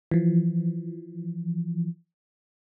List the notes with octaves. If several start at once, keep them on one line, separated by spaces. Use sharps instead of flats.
E3 F3